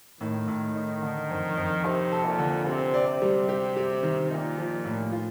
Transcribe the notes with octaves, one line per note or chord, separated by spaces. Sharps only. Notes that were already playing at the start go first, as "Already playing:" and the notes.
A2 D#3
A2
D#4
D3
F2
F2
C3 D#4
A4
A#2
D3
C3 C4
D5
C3
G3
G4
G4
D#3
A#2 D#4
F3
A2
F4